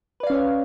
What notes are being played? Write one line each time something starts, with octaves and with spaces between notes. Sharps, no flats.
C#4 B4 C#5 D5 F5